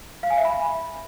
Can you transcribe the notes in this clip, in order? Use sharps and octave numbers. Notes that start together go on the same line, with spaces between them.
F5
G#5
E5
B5